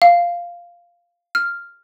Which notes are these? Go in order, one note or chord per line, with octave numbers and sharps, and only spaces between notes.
F5
F6